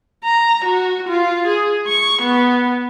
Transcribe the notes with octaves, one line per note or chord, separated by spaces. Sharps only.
A#5
F#4
F4
G#4
C#6
B3